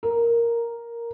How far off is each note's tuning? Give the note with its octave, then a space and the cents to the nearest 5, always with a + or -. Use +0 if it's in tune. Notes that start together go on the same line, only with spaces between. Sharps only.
A#4 +0